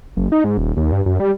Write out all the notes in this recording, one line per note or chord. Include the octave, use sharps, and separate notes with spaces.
F#1
D#4
G#2
D#1
D#2
G2
F#2
G3